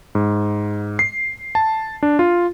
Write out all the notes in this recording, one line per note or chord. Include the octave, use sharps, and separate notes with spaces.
G#2
C7
A5
D4
F4